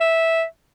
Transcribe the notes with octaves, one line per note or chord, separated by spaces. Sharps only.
E5